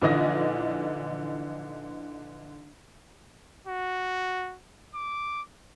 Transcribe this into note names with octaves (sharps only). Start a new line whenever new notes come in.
A#1 D3 E3 D#4 D#6 A#6
F#4
D6